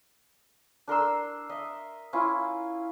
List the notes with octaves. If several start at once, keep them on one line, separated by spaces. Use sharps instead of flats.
D4 A#4 C6 E6
D#5 E5
C#4 E4 F4